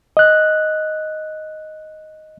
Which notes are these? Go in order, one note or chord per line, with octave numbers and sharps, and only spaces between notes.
D#5 F#6